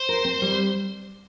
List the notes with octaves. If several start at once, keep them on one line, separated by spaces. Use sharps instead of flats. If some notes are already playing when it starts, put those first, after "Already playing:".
Already playing: C5
A#4
C4
G3